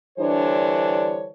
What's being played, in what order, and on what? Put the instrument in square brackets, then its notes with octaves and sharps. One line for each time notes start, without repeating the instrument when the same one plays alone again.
[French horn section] D3 E3 G3 D4 C5 C#5